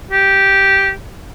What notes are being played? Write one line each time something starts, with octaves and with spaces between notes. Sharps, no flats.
G4